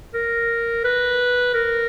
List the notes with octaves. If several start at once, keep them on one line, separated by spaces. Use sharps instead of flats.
A#4
B4
A#4